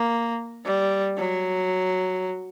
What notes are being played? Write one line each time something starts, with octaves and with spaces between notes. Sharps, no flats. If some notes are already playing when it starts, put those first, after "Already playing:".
Already playing: A#3
G3
F#3